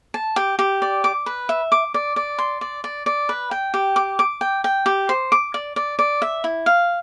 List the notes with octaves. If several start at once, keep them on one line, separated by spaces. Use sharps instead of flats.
A5
G4
G4
D5
D6
B4
E5
D6
D5
D5
C6
D5
D5
D5
B4
G5
G4
D6
D6
G5
G5
G4
C5
D6
D5
D5
D5
E5
E4
F5